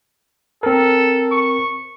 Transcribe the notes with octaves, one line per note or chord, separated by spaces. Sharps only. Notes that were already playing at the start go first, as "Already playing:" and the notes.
C4 A4 A#4
C#6